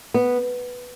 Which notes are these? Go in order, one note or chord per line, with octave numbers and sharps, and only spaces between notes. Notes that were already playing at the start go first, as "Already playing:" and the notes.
B3